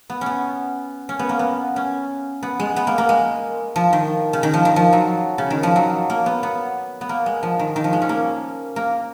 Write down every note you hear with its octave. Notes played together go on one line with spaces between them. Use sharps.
B3
B3 C#4
C#4
B3
A#3
B3
C#4
B3
G#3
B3
A#3
A#3
G#3
F3
D#3
C#3
D#3
F3
D#3
F3
F#3
C#3
D#3
F3
F#3
A#3
B3
B3
B3
A#3
G#3
F3
D#3
D#3
F3
G#3
C#4
A#3
A#3